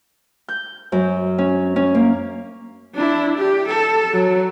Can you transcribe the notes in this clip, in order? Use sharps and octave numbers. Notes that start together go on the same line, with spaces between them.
G6
F#2
C#4
C#4
A#3
D4 E4
G4
A4
F#3